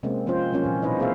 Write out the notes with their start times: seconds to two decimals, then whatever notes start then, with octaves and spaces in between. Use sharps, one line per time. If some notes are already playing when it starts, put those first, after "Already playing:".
0.03 C3 G#3 A#3 C4 C#4
0.27 F3 C4 C#4 F4 C5 D#5
0.52 F#3 A#3 C4 C#4 F4
0.64 A#2 E3
0.82 B2 D#4 B4 C5 D#5
0.99 A#3 C4 G#4 C5 E5 F5